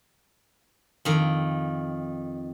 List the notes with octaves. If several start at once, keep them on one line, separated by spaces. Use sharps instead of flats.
F2 D#3